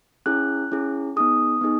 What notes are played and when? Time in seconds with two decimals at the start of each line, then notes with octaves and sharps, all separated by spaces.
0.26 C#4 E4 G#4 F#6
0.72 C#4 E4 G#4
1.17 B3 D#4 G#4 D#6
1.61 B3 D#4 G#4